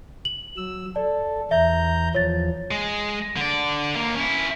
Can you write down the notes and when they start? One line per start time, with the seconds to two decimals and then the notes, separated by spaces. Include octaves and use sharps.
0.25 F#7
0.57 F#3 E6
0.96 A4 D5
1.51 E2 E5 A#5 G6
2.15 E2 F3 C#5 A6
2.71 G#3
3.37 D3 D5
3.96 D#2 A#3
4.16 C#4 E4